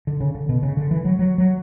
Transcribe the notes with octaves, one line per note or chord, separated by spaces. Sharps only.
D3
C#3
D3
B2
C#3
D3
E3
F#3
F#3
F#3